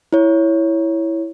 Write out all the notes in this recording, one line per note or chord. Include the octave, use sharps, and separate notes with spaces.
E4 C#5